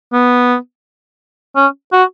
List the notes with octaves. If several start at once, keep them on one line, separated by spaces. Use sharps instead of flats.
B3
C#4
F#4